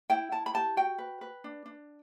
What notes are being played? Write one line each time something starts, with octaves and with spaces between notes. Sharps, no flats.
E4 G5
E4 A5
B5
G4 A5
F#4 G5
B4
B4
D4
D4